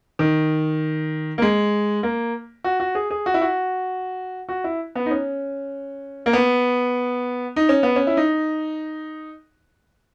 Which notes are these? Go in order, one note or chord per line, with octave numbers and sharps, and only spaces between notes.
D#3
A#3
G#3
A#3
F#4
F#4
G#4
G#4
F#4
E4
F#4
F#4
E4
B3
D#4
C#4
A#3
B3
D#4
C#4
B3
C#4
E4
D#4